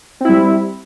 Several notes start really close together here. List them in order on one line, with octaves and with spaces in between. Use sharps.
C4 E4 G3